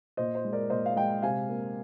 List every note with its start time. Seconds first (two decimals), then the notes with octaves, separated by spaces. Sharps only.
0.17 A#2 C5 D#5
0.35 C5
0.45 G#3
0.53 A#4 D5
0.70 A#2 C5 D#5
0.86 F5
0.96 G#3 D#5 G5
1.22 C3 F5 G#5
1.49 A#3